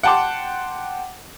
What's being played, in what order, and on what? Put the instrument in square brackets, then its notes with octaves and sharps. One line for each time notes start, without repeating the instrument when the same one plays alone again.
[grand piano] F#5 G5 A5 C6 D6